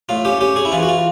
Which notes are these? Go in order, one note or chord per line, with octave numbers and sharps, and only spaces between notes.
A2 F4
C#4 G4
C#4 G4
C#4 G#4
E4
E3 F4
F#4
F4